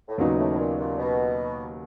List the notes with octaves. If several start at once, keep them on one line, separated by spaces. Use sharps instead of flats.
A2
D#2 A#2 C#3 F#3 B3 D#4
A2
A2
A#2
A#2
B2